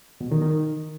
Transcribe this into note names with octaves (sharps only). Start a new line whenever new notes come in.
B2
D#3
D#3